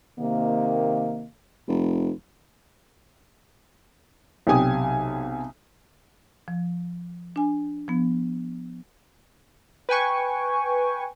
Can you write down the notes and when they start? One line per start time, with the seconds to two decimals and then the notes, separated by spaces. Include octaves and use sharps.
0.18 C3 D#3 A#3
1.68 F1
4.47 B1 C3 G4 G#5 D#6
6.48 F3
7.36 D4 G#5
7.88 F3 B3
9.89 B4 G5 G#5 C#6